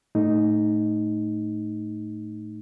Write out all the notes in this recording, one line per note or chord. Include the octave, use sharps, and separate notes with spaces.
A2 A3 D#4